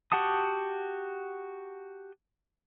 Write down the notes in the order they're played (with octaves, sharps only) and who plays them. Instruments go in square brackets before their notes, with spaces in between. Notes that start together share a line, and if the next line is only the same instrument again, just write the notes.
[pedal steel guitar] F#4 G4 F#5 A5 D#6